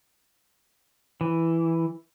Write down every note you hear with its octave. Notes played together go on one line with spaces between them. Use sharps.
E3